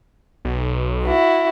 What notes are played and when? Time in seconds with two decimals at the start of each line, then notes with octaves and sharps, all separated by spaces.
0.45 B1
1.06 E4 F#4